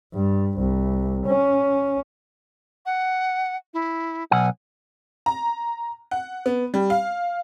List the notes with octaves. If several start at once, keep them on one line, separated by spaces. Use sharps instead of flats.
G2
C2
C#4
F#5
E4
B1 F#5 G#5
A#5
F#5
B3
G3
F5